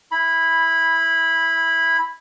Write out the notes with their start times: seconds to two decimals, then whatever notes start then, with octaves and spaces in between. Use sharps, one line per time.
0.11 E4 B5